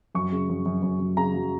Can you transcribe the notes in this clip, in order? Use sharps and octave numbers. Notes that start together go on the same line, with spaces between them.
F#2 C#6
C#3
F#2
F#2
F#2
F#2
C#3 A#5
F#3